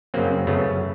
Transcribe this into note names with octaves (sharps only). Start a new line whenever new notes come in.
F#2 C#3 F#3 A#3 C4
F#2 C#3 F#3 A3 B3